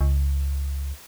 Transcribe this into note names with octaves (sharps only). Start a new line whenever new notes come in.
C#2